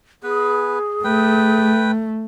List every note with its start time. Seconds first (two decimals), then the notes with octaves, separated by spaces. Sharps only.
0.23 B3 G#4 B4
1.04 A3 B4 G5